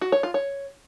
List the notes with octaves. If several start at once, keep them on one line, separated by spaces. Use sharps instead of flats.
F#4
C#5
F4
C#5